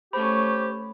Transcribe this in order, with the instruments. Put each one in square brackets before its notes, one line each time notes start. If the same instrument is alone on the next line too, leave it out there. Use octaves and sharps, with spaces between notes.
[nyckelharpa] A3 C#4 [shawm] G4 [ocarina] C5 [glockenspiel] B5